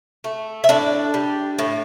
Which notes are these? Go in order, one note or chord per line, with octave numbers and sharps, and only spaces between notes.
A3
E5
A2 D4 D5
G3
A2